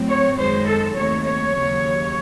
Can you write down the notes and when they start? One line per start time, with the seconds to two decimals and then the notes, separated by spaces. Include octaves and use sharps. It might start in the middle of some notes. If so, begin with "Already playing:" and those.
Already playing: A2 F#3 C4
0.09 C#5
0.38 F#2 D#3 G#3 C5
0.66 A4
0.95 D#2 D#3 A3 C4 C#5
1.24 C#5
1.53 D#2 C#3 F#3